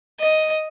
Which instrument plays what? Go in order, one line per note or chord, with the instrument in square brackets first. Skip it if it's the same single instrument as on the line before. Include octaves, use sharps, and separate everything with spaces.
[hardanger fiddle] D#5